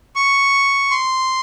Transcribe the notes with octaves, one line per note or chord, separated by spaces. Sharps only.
C#6
C6